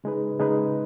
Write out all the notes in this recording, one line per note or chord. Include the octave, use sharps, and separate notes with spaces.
C#3 G#3 D#4 G#4 B4
C#3 G#3 D#4 G#4 B4